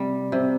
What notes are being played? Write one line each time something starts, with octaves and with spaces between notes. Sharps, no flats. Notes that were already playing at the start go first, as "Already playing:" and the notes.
Already playing: C3 G3
C3